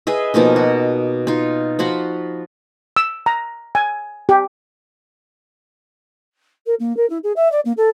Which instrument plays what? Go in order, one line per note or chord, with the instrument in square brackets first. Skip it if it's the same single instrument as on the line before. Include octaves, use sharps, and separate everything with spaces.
[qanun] G#4 B4 D#5 E5
B2 F3 A#3 D#4
F#4
D#4 F4
F3 F4 F#4 B5
[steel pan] E6
A#5
G#5
G4
[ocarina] A#4
A#3
A#4
E4
G#4
E5
D5
A#3
A4